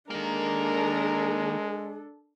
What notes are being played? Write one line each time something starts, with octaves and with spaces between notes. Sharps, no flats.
D#3 G#3 A#3 D4 A4 A#4